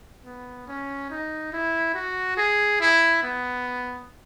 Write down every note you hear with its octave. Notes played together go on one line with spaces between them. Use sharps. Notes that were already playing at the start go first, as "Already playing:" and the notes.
B3
C#4
D#4
E4
F#4
G#4
E4
B3